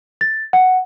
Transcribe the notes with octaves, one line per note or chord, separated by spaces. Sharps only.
A6
F#5